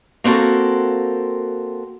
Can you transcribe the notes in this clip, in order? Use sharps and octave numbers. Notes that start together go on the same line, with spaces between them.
A#3 C4 F#4 A4 A#4